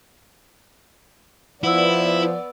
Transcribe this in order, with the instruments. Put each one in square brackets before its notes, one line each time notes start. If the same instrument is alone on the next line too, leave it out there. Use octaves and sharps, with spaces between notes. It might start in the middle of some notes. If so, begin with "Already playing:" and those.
[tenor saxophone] F3 [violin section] B3 D5 [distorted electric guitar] E4 [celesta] F#5 E6